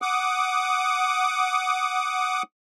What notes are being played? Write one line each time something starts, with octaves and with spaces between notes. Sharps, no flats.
F#5 D6 D#6